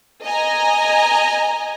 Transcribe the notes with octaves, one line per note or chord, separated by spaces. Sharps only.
D#5 G#5 A#5